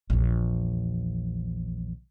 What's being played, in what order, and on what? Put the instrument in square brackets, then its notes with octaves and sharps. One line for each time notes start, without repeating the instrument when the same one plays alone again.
[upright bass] A#1 E2